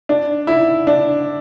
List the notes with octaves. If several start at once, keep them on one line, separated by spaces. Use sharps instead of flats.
D4
E4
D4